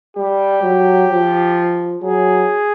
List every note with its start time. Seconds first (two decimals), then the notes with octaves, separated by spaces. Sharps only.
0.16 G3 G4
0.63 F#3
1.10 F3
2.03 F#3 G#4